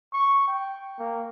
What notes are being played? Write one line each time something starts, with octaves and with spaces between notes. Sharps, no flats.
C#6
G5
A#3